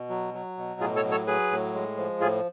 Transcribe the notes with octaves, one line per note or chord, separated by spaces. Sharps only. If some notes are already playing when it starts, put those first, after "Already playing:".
Already playing: B2
F#3
F#3
B2
A2 F4 G#4
A4 C#5
F#3
A4 C#5
F#3 G#4 B4
A2
G#3
F3
A2 F4 G#4